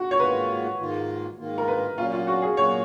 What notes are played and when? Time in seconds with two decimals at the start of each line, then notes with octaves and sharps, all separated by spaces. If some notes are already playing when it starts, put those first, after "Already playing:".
Already playing: F#4
0.11 C#5
0.20 G#2 D#3 A#3 F4 B4
0.79 G#2 D#3 A#3 F4
1.38 G#2 D#3 A#3 F4
1.58 A#4
1.68 B4
1.97 A#2 F#3 A#3 C#4 F4
2.13 F4
2.27 F#4
2.42 G#4
2.56 A#2 F#3 A#3 C#4 C#5